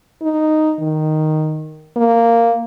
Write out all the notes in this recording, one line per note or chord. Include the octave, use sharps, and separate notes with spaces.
D#4
D#3
A#3